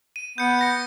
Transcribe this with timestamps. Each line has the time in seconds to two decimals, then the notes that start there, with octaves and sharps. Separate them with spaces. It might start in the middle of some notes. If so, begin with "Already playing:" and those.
0.16 D#7
0.38 B3 G6 C#7
0.59 G6 A#6 C#7